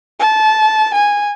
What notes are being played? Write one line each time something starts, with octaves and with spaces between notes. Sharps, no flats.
A5
G#5